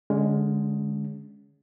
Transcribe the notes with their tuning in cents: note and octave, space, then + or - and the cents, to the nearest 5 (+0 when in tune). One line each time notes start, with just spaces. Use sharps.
D3 +0 G#3 +0 C#4 +25